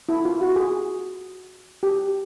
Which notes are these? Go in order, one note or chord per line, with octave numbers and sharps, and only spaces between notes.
E4
F4
F#4
G#4
G4